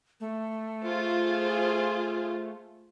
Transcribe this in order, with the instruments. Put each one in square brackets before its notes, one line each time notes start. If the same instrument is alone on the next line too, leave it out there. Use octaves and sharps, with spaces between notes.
[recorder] A3
[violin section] F4 G#4 C5